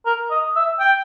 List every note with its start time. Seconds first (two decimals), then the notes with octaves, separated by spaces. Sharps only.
0.06 A#4
0.30 D#5
0.56 E5
0.80 G5